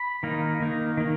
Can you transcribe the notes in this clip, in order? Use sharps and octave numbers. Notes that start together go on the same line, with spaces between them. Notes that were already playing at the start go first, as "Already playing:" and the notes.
Already playing: B5
D#3 A#3 D#4
D#3 A#3 D#4
D#3 A#3